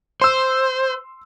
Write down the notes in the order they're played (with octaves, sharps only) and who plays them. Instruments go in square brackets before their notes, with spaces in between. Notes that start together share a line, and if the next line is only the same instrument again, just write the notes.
[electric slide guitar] C5 [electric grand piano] C6 E6